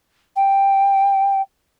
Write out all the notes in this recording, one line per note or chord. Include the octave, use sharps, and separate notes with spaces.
G5